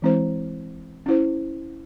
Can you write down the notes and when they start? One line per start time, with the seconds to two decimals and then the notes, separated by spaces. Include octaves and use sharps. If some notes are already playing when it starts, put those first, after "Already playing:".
0.02 E3 G#3 C4 E4 C5
1.06 C#4 E4 C5